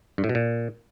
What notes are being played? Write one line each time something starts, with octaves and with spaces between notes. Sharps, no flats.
G2
A2
B2
A#2